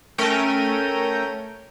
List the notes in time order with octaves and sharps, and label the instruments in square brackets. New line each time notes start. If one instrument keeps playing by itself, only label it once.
[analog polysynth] A3 C#4 A#4 G5 D#7